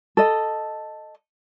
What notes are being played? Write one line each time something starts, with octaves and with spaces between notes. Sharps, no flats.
A4 D#5